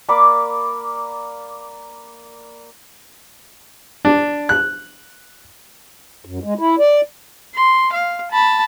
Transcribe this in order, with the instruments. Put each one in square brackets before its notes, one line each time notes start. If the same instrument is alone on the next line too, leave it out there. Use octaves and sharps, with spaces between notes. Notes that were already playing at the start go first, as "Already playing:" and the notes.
[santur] A#3 D5 B5 D6
[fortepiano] D4
F#6
[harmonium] F#2
G#3
E4
D5
[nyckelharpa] C6
F5
A5 B5